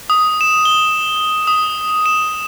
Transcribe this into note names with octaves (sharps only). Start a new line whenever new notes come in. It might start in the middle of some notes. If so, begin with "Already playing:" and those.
D#6
E7
G7
D#6
E7